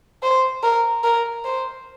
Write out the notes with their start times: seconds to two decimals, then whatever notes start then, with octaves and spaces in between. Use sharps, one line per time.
0.23 C5
0.63 A#4
1.04 A#4
1.44 C5